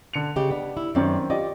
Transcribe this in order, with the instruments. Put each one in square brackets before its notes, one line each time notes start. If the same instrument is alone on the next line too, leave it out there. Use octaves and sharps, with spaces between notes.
[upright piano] D3 C#7 F7
[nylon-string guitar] C#3 G4 [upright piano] D#5
[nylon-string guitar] B3 [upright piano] D4
[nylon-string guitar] E4
[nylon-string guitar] F#2 D5 [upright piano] D#3 C4 C#4
[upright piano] F4 G4 D#5 [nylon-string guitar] D5